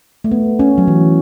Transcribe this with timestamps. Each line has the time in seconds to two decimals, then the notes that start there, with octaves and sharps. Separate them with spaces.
0.24 A3
0.32 B3
0.59 C#4
0.78 F#3
0.88 E3